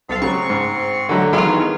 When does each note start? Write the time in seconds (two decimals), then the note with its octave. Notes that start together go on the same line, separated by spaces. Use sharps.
0.09 C2 C4 A4 F5
0.22 C#3 F#3 G#3 C#6
0.50 G#2
1.09 D3 D#3 F#3 A3
1.33 D#3 E3 F#3 G#3 B3 F4 C#5